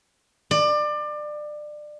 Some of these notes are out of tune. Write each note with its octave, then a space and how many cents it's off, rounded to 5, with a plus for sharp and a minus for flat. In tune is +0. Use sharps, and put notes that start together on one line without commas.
D5 +25